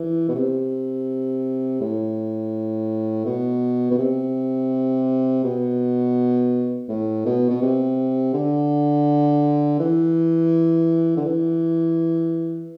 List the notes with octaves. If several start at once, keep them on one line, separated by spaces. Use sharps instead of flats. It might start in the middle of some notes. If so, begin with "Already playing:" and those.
Already playing: E3
B2
C3
A2
B2
B2
C3
B2
A2
B2
B2
C3
D3
E3
D3
E3